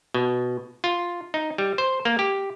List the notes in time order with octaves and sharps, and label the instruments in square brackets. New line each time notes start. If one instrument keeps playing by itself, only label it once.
[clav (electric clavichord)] B2
F4
D#4
G3
C5
A#3
G4